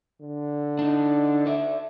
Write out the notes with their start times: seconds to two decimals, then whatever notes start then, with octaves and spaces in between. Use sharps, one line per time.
0.21 D3
0.79 D4 D#4
1.46 A4 D5 E5